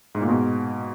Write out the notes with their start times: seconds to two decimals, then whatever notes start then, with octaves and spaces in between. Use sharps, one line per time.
0.15 G#2
0.21 A#2
0.28 G#2 B2